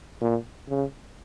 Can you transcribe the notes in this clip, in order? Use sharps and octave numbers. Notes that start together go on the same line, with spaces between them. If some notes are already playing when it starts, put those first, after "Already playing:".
A#2
C#3